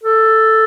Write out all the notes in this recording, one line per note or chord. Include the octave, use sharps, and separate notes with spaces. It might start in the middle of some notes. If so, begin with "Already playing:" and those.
A4